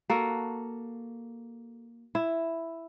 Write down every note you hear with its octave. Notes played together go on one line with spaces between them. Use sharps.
A#3 F#4 A4
E4